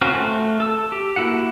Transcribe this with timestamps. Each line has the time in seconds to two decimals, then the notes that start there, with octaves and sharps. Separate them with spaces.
0.01 C4 C#4 F4 F#4 A#4
0.13 A3
0.60 A4 E6
0.92 G4
1.16 A#3 E4 F#4 F#5